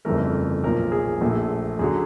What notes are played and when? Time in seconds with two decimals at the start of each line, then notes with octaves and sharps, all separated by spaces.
0.05 G1 F2 C#3 E3 A3 A#4
0.63 B1 A#2 F3 A#4
0.92 G#4
1.21 A#1 A#2 F3 A3
1.79 F#2 D3 F#3 G#4